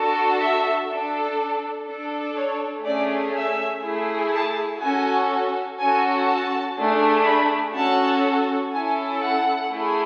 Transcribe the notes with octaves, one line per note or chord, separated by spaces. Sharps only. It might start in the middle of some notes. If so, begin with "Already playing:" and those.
Already playing: D4 F#4 A4
E5
D4 A4
D4 A4
C#5
A3 C#4 G#4 D5
E5
A3 E4 G#4
A5
C#4 F#4 A4 G#5
C#4 F#4 A4 G#5
A5
A3 D4 G#4
B5
C#4 F#4 A4 A5
C#4 E4 A4 G#5
F#5
A3 E4 G#4